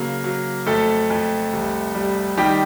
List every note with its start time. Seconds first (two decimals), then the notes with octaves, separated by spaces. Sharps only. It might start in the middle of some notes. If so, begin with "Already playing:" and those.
Already playing: C#3 F#3 A#3
0.24 F#3
0.66 F2 A3 A4
1.10 F2
1.53 C2
1.95 G3
2.37 D#3 G3 G4